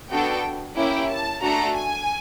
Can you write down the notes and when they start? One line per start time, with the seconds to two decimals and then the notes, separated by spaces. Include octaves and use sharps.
0.10 B3 D4 F#4 A4 G5
0.76 A#3 C#4 E4 G4 G5
1.09 A5
1.42 A3 D4 F#4 A4 A#5
1.75 G#5